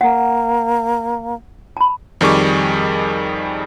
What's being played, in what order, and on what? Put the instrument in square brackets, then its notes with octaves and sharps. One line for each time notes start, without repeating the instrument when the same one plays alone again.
[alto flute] A#3 [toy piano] F#5
[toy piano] A5 B5
[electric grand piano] F2 D#3 G3 G#4 C#6 D6